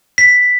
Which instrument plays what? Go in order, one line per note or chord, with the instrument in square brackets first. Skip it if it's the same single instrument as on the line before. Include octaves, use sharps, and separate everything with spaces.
[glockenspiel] B6